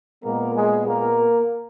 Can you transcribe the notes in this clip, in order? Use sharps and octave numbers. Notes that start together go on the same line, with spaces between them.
A#2 G#3 A#3 B3 A#4
G#3 G#4
A#3 A#4